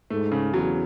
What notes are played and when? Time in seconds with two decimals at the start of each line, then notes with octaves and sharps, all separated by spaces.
0.10 G#2 A3
0.32 C#3
0.53 E2 F#3